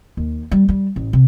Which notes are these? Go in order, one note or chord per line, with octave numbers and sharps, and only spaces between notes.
D#2
G3
G3
A1
C3